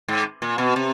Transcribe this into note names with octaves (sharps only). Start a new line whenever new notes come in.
G#2
A#2
B2
C3